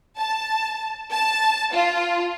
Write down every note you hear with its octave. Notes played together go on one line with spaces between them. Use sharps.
A5
A5
F4